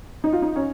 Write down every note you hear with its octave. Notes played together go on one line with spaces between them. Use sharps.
D#4
F4
D#4
C#4